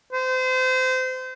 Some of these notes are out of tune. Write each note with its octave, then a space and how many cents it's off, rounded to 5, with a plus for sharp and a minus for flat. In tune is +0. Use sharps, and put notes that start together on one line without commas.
C5 -30